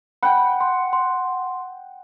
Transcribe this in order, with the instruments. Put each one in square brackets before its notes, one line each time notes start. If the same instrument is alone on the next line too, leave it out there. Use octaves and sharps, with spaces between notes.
[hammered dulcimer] F#5 G5 [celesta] B5
[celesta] C6
C6